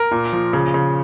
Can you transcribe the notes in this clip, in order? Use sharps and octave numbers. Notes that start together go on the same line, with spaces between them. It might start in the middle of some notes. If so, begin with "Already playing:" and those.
Already playing: A#4
A#2
F3
C#3
C#3